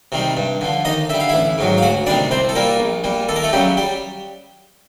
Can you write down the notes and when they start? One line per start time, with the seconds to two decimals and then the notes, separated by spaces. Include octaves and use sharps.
0.12 C3 D#3 G3
0.37 G2
0.61 D3 F3
0.85 D#2 D#4 D#5
1.09 D3 G3 E5
1.20 F5
1.29 A1 E4 E5
1.58 G#2 D#3 F#3
1.78 F5
1.83 D2 F#4 F#5
2.06 C3 D#3 G3 D4 D5
2.31 C2 C4 C5
2.49 A4
2.55 A#2 G3 A#3 A#4
2.80 A#1
3.04 A#2 G3
3.29 D#2 A4
3.36 A#4
3.43 A3 A4
3.53 C#3 F#3 G3 G4
3.77 G3 G4